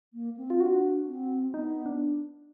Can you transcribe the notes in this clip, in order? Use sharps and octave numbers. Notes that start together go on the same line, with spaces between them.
A#3
C4
F4
D4 F#4
C4
B3 D#4
D4